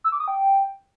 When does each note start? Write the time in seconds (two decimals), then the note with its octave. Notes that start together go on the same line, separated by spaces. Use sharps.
0.04 E6
0.12 D6
0.20 D#6
0.28 G5